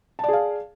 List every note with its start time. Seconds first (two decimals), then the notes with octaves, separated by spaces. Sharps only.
0.19 A5
0.24 D5
0.28 G#4
0.33 F5